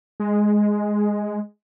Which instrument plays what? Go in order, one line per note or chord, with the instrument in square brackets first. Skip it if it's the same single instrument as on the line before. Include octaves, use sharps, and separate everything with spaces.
[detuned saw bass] G#3